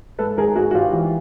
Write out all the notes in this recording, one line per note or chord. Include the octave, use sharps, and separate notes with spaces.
G#2 A4 B4
G#1 G#4 A#4
G#2 F#4 G#4
F#4
G#1 F4 G4
E3